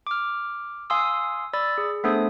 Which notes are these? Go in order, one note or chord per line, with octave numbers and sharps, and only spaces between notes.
D6 F6
F5 G#5 C6 D#6 E6
D5 B5 E6 A6
G#4
A3 B3 D4 A4 C5 D#6